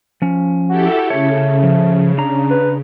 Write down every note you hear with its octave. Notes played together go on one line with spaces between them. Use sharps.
F3 C#4
E4 F#4 G4 A4
C#3 A3 C#5
F3
D4 A#5
B4